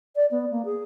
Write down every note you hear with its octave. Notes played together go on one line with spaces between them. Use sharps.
D5
B3
A#3
G#4